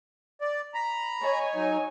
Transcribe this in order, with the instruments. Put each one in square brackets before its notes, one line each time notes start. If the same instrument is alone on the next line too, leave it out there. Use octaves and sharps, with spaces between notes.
[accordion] D5
A#5 B5
[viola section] C#5 [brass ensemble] D#5 G#5
[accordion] F#3 D#4